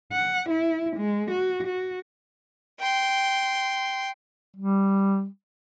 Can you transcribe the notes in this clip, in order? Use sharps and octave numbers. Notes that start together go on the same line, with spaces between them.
F#5
E4
G#3
F#4
F#4
G5 C6
G3